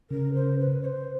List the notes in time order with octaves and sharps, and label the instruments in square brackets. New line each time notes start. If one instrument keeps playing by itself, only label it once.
[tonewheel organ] C#3 [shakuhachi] A#4
[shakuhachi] C5
B4
C#5
C5